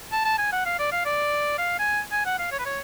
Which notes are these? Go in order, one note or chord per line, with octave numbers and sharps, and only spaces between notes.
A5
A5
G#5
F#5
F5
D5
F5
D5
F5
G#5
G#5
F#5
F5
C#5
B4
C#5